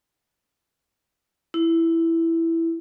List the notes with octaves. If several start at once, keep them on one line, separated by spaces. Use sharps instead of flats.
E4